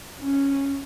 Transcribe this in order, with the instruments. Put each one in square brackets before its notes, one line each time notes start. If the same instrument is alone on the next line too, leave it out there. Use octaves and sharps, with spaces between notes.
[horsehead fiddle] C#4